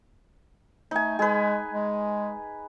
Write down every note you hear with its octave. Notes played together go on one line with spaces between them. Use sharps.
A3 D#4 G#5
G#3 G#4 B4
G#3